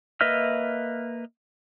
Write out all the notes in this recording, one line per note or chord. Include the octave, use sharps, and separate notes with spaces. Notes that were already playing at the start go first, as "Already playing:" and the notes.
A#3 B4 D#5 E5 F6